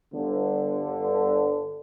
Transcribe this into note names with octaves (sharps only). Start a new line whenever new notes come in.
G1 D3